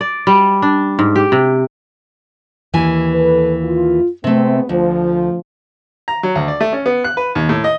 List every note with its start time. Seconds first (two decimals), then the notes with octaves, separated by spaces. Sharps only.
0.01 D5
0.27 G3
0.62 D4
0.99 G#2
1.16 G4
1.32 C3
2.73 D#2 E3 G#5
3.14 A4 B4
3.64 F4
4.24 C3 G#3 A3 B3 C4
4.69 D2 F3
6.08 A#5
6.23 F#3
6.35 D2
6.48 D5
6.61 A3
6.73 C#4
6.86 B3
7.04 F#6
7.17 B4
7.35 D#2
7.49 A2
7.64 D#5